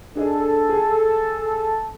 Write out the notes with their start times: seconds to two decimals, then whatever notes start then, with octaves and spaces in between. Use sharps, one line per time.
0.15 D4 G#4 A4 D#5
0.69 G#4